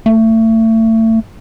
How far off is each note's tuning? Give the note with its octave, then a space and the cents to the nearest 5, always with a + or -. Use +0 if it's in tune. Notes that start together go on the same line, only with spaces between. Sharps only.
A3 +30